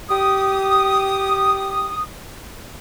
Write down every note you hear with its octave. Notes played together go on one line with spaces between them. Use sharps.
G4 D#6